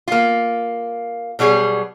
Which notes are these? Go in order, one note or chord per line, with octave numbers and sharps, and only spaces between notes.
A#3 F4
B2 F#3 G3 G#4